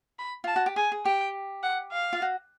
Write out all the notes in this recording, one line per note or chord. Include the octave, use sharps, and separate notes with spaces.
B5
F4 A5
F#4
G4
G#4 G#5
G#4
G4 G5
F#5
F5
F4
F#4